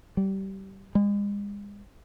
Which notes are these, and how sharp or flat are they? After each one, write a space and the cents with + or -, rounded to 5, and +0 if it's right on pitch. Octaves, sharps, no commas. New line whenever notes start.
G3 -20
G#3 -40